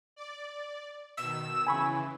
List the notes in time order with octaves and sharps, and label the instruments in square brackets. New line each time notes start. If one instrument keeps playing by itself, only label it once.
[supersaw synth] D5
[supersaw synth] B2 D#3 [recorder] E6
[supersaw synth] C#3 E3 [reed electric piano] G#5 B5 C#6